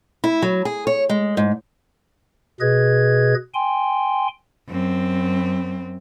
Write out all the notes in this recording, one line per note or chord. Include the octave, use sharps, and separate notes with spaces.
E4
F#3
G#4
C#5
G#3
G#2
B2 G#4 B4 D#5 G#6
G5 G#5 C6
F#2 C4